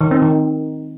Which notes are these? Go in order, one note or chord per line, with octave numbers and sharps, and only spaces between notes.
D#3
C4
D#3